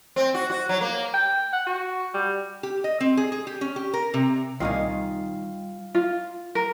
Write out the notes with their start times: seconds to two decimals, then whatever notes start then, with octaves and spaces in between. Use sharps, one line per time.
0.16 C4
0.34 F#4
0.50 F#4
0.69 F#3
0.81 A#3
1.14 G5
1.53 F#5
1.67 F#4
2.14 G3
2.63 G4
2.84 D#5
3.01 C4
3.17 G#4
3.32 G#4
3.47 G4
3.61 C#4
3.76 G4
3.93 A#4
4.14 C3
4.60 C2 A#2 D#3 G3 D#4 F4 F5 G#5
5.95 F4
6.55 A#4